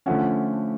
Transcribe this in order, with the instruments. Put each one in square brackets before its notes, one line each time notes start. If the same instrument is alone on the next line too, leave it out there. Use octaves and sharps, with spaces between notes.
[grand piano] D3 F3 A3 C#4 F#5